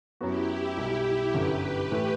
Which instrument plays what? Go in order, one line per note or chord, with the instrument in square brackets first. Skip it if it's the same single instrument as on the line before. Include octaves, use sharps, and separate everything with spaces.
[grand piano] F#2 F#3 B3 F#4 [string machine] E4 G4
[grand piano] B1 B2 G3
[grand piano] G1 F#2 D3 [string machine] G4 B4
[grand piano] A2 E3 A3 E4